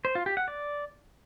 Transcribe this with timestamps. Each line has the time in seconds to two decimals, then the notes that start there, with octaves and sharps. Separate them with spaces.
0.05 C5
0.15 F4
0.26 G4
0.37 F#5
0.48 D5